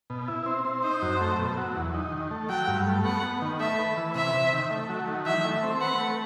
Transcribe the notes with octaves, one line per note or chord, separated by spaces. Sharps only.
B2
E4
C4
C4
D#4 C5
F#2
A3
B2
F#3
E2
D#4
D#3
A3
F#3 G5
G2
A3
B3 F#5
B3
D#3
A3 E5
B4
E3
C3 E5
C3
D#3
A3
F#3
D#3
E3 E5
A3
C4
B4 F#5
A3